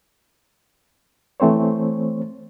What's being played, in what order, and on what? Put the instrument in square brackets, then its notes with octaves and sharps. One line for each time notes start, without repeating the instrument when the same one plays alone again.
[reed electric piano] E3 A3 C4 C5 C#5